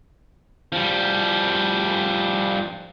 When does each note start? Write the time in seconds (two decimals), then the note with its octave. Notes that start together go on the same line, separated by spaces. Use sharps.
0.72 F3 G3